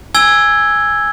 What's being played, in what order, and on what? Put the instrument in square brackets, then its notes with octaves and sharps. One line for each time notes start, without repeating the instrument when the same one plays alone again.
[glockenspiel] G#5 E6 G#6 G7